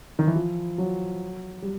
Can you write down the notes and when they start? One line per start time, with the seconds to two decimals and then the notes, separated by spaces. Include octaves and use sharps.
0.19 D#3
0.27 E3
0.36 F3
0.78 F#3
1.62 G3